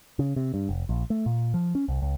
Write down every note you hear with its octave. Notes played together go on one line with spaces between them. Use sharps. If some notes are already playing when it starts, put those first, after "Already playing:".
C#3
C3
G2
F1
A#1
A3
A#2
F3
C#4
C2
C#2